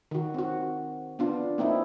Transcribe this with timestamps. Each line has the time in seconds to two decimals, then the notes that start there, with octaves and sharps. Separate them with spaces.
0.11 D#3 F#4
0.34 C4 F#4
1.19 B3 D4 F4
1.58 A#3 C4 D#4 E4